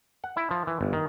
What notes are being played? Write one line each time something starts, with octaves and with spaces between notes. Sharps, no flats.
F#5
E4
F3
E3
G1
D#3